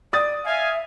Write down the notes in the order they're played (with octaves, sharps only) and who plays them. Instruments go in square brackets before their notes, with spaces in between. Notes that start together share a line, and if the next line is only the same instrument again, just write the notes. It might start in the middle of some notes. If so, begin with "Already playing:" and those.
[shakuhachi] D5 [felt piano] D#6 A6
[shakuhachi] E5 [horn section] F5 G#5